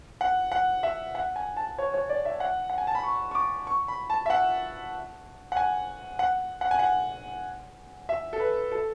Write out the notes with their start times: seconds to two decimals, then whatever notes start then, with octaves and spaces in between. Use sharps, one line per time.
0.21 F#5
0.52 F#5
0.83 E5
1.15 F#5
1.36 G#5
1.57 A5
1.78 C#5
1.94 C#5
2.10 D5
2.25 E5
2.40 F#5
2.70 F#5
2.78 G#5
2.87 A5
2.95 B5
3.03 C#6
3.31 C#6
3.35 D6
3.67 C#6
3.88 B5
4.10 A5
4.26 E5
4.30 F#5
5.52 F#5
5.57 G#5
6.19 F#5
6.61 F#5
6.71 G#5
6.79 F#5
8.09 E5
8.33 A4
8.40 B4
8.72 A4